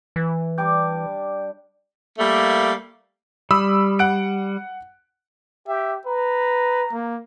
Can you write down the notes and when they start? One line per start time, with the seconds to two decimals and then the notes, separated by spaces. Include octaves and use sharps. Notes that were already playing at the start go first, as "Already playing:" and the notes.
0.16 E3
0.58 G3 D4 D5 G5 D6 G6
2.18 G3 A3 A#3
3.51 G3 B5 D#6 E6
3.99 F#5 F#6 D7
5.68 G4 E5
6.07 B4 A#5
6.93 A#3